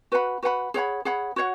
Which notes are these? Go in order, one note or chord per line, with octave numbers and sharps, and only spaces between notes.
F#4 B4 F#5 B5
F#4 B4 F#5 B5
G#4 C#5 F#5 B5
G#4 C#5 F#5 B5
F#4 C#5 F#5